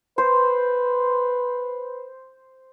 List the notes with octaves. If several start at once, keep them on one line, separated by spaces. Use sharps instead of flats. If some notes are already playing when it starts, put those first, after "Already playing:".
B4 C5